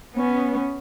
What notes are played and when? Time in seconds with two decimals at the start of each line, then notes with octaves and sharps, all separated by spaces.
0.15 B3 C#4